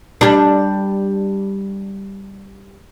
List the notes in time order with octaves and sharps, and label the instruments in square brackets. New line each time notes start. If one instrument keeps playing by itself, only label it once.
[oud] G3 D4